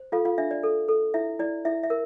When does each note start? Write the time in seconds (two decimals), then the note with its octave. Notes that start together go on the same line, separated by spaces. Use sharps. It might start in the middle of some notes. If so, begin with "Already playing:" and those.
Already playing: C5
0.12 F4 A4 F5
0.25 F4 F5
0.38 D4 E5
0.51 D5
0.63 A4
0.88 A4
1.14 E4 E5
1.39 E4 D5
1.65 E4 E5
1.83 E5
1.90 A#4